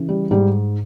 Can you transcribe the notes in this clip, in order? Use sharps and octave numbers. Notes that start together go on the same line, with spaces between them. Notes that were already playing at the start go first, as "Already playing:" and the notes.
Already playing: C#3 E3
G3
G#2 G3